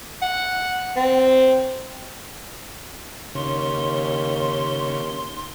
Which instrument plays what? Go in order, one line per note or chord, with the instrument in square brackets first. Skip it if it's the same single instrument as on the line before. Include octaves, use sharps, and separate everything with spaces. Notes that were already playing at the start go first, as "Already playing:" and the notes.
[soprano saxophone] F#5
C4
[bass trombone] D#2 [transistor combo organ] C#3 [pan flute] C6